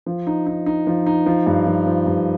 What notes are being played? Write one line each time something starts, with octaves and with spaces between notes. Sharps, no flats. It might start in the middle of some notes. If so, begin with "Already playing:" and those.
F3
D#4
D#4
D#4
F3
D#4
F3
G2
F3
F3
G2